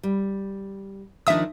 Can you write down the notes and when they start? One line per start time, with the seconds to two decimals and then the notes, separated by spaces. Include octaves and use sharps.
0.03 G3
1.27 D#3 F3 D4 E5 D#6